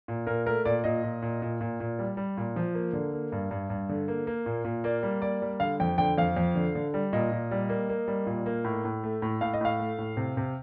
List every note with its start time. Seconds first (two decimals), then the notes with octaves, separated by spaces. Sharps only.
0.08 A#2
0.27 A#2 A#4
0.46 A3 A#4
0.65 A#2 D5
0.84 A#2 D#5
1.03 A#2
1.22 A#2
1.42 A#2
1.61 A#2
1.80 A#2
1.99 G3
2.17 G3
2.37 A#2
2.56 F3
2.74 A#3
2.93 D3
3.13 A#3
3.32 G2
3.51 G2
3.70 G2
3.89 D3
4.08 A#3
4.27 A#3
4.46 A#2
4.65 A#2
4.84 A#3 D5
5.03 G3
5.22 A#3 D5
5.42 G3
5.60 D3 F5
5.80 F2 G5
5.98 D3 G5
6.18 F2 F5
6.37 F2
6.55 D3
6.75 D3
6.94 G3
7.13 A#2 D#5
7.32 A#2
7.51 G3
7.69 A#3
7.89 A#3
8.08 G3
8.27 A#2
8.46 A#3
8.64 A2
8.85 A2
9.04 A3
9.22 A2
9.41 A2 F5
9.54 D#5
9.61 A2 F5
9.79 A3
9.98 A2
10.17 C3
10.37 C3